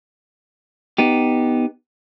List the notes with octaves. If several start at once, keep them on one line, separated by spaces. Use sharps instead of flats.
B3 D#4 G4